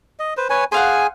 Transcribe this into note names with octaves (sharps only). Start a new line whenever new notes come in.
D#5
B4 C5
B4 C#5 G#5
G#4 C5 F5 F#5 G#5